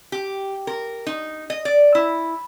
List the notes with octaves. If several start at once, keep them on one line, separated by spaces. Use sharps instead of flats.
G4
A#4
D#4
D#5
D5
E4